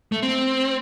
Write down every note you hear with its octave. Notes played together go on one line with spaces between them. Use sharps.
A3
C4